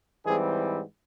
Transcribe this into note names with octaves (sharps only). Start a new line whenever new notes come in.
G#2 E3 G3 C4 G#4